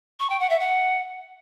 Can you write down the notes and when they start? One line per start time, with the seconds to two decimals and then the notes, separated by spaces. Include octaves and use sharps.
0.19 C#6
0.29 G5
0.39 F#5
0.49 E5
0.59 F#5